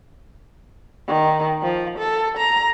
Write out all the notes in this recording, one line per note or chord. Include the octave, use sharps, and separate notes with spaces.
D#3
F3
A4
A#5